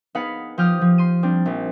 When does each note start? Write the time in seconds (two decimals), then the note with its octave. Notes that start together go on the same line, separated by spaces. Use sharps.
0.15 B3 D#4 G#4 F5 F#5 B5
0.58 F3 G4 D#6 F6 G6
0.81 F3
0.98 C6 D#7
1.23 G3 C4 D4
1.46 A#1